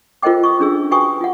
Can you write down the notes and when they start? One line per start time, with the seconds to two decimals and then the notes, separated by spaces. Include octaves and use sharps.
0.22 F4 A#4 C5 D#5 G5 D6
0.44 C#6 D#6
0.59 C#4 D4 G#4 E6
0.91 F#4 B4 G5 G#5 C#6 D#6
1.21 F4 F#5